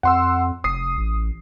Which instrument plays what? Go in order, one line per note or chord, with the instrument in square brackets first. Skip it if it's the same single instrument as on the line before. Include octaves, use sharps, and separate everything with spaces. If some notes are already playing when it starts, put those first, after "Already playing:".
[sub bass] F2 [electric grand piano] F#5 C6 E6
[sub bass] F1 [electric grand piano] D#6 C7
[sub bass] A1